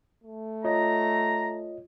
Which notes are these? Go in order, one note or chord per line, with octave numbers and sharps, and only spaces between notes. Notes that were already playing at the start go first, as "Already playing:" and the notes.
A3
F4 C#5 D#5 A#5